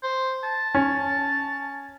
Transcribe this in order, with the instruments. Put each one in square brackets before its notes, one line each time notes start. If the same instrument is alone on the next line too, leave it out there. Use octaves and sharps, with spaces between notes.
[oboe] C5
A5
[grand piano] C#4